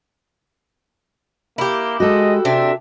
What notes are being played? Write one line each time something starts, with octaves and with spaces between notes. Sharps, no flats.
A#3 E4 G4
G#3 F#4 A4 D#5
C3 D4 E5 G5